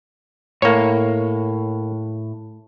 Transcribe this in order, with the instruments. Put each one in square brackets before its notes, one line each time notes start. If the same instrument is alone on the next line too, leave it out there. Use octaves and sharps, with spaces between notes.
[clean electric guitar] A2 [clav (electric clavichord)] A#3 C#5